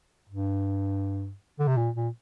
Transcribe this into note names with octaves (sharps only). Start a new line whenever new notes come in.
G2
D3
C3
A#2
A#2